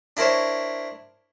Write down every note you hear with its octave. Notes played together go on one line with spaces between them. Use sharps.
D4 E4 A#4 C5 C#5